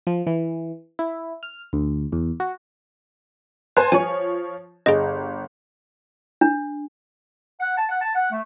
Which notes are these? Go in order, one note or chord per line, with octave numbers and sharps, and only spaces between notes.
F3
E3
E4
F6
D2
E2
F#4
B4 C5 G#5 A5
F3 C#5 G#5
G1 G#4 D#5
D4
F#5
A5
F#5
A5
F#5
A3